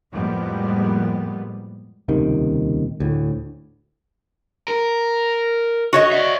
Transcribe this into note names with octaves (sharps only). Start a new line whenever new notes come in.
F2 A2 G3 G#3 A#3 B3
D#1 C#2 C3 D#3
D2 A2
A#4
F#4 C#5 D#5
D5 E5